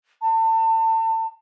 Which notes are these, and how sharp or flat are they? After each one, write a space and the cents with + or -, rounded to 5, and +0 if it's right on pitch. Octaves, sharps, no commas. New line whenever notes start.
A5 +35